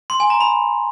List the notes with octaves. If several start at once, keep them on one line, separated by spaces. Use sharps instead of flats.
C6
G#5
A#5
B5